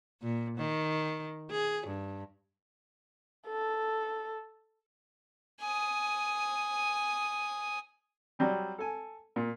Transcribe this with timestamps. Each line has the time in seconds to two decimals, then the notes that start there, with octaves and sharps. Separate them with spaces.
0.22 A#2
0.57 D#3
1.51 G#4
1.87 G2
3.47 A4
5.61 G#5 D#6
8.39 F#3 G3 C4
8.78 A4 G#5
9.36 A#2